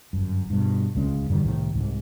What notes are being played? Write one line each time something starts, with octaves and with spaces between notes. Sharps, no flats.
G1 F#2
G2 B2
D1 C#2 G#3 C#4
F#2 D3 D#3 G3
C2 A2 D#3
C2 G#2